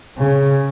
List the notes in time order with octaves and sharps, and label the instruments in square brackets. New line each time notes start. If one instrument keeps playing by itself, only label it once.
[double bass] C#3